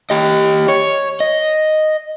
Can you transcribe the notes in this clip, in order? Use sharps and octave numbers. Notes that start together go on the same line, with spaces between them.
G4 D#5
C#5
D#5